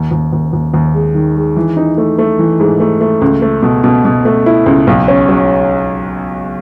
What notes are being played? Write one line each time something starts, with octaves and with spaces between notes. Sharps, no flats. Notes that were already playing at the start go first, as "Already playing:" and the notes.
Already playing: D#2
D#2
D#2
D#2
D#2
G#3
D#3
G#3
E3
D#4
A3
A3
E3
G#2
A3
A3
C#2
A3
B2
B2
B2
A3
E4
C#2
B1
C#4
F#3